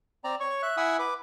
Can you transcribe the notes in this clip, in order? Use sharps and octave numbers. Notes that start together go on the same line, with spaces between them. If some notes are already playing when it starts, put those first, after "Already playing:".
C4 D5 A#5
C#5 C#6
E5 F#6
E4 E5 F#5 G#5 D#6 E6
B4 D6